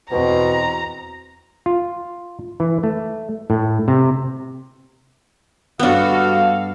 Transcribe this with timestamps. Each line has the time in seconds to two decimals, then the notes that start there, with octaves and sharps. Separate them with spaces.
0.12 E2 B2 C4 A#5
1.66 F4
2.60 E3
2.83 A3
3.50 A2
3.88 C3
5.79 G2 B3 D4 F#4 A4 F5